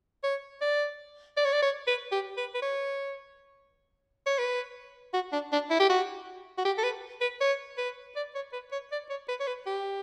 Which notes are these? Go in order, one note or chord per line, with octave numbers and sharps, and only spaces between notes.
C#5
D5
D5
C#5
D5
C#5
B4
G4
B4
B4
C#5
C#5
B4
F#4
D4
D4
E4
G4
F#4
F#4
G4
A4
B4
B4
C#5
B4
D5
C#5
B4
C#5
D5
C#5
B4
C#5
B4
G4